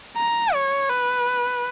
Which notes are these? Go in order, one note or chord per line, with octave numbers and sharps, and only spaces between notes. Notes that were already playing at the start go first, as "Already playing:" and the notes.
A#5
C#5
B4